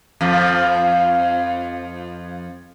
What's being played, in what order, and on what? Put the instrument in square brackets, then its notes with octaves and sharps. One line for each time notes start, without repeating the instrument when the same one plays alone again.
[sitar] F2 F3